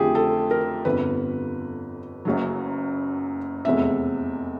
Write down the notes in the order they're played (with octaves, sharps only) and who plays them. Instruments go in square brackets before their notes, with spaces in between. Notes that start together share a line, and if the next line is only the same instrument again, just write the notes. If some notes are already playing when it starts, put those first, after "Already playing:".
Already playing: [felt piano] F2 D3 F3 A3 G4 G#4
A4
A#4
G1 F2 D3 B4
F#1 F#2 C#3 F#3
F1 E2 C3 E5